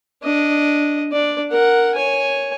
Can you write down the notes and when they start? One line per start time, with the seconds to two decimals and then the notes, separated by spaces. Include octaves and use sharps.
0.23 D4 D#5
1.12 D4 D5
1.51 A#4 F#5
1.95 C#5 G#5